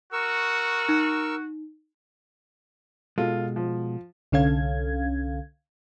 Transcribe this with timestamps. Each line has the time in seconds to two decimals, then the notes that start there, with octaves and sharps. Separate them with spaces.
0.13 F#4 A#4 C#6 E6
0.89 D#4
3.18 B2 G#3 F4 A4
3.56 F3
4.32 C2 D3 C#4 A4 F5 G#6